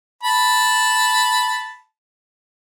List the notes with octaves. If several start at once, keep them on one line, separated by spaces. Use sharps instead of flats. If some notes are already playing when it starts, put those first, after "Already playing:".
A5 B5